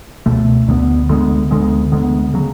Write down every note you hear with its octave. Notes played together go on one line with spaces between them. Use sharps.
C#2 B2 A3
D2 D3 G#3 B3
D2 D3 G#3 B3
D2 D3 G#3 B3
D2 D3 G#3 B3
C#3 F#3